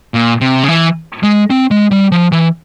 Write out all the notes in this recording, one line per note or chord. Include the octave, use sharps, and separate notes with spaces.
A#2
C3
C#3
E3
G#3
C4
G#3
G3
F3
E3